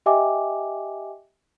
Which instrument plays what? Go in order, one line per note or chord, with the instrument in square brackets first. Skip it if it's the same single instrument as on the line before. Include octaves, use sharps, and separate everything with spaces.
[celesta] G4 D#5 E5 G5 G#5 D6